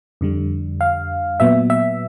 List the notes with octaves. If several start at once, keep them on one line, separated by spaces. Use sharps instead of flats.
F2 D3 G3
F5
A#2 F#3 B3 E5
E5